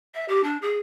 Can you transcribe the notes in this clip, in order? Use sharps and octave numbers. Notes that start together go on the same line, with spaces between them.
E5
G4
D4
G#4